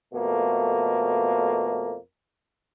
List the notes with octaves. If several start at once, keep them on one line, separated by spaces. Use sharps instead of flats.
F2 B2 A3 A#3